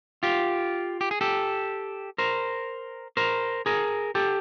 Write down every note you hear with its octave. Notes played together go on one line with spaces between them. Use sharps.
F4 G4
G4
G#4
G4 A4
A#4 C5
A#4 C5
G#4 A#4
G4 A4